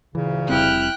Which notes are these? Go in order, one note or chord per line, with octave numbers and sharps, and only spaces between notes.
D2 A#2 C#3 E3
F1 G3 C4 E4 G5 F6 F#6